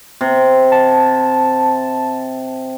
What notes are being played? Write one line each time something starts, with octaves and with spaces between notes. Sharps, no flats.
C3
A5